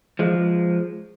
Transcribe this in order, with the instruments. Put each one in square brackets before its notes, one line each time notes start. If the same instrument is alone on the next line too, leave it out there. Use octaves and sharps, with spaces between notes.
[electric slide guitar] F3 G#3